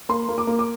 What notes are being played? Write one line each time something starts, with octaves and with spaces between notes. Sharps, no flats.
A#3 C6
A#3
D6
A#3
D6